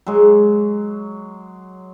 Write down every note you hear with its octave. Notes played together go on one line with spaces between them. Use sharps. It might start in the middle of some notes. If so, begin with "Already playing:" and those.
F#3 G#3